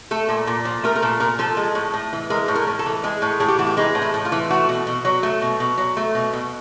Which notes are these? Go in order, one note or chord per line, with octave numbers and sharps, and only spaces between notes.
A3 A4
A#2
A#2
F3
A3 A#4
A#4
A#2 A4
A#2 A#4
F3 A4
G#3
A2
A2
E3
G#3 A#4
A2
A#4
A2
A4
E3
G#3 G#4
A2
A2 G#4
G4
E3 F#4
G4
G#3 D#4
A2
E4
A2
F4
E3
A3 F#4
B2
B2
F#3
A3
B2
B2
F#3
A3
B2
B2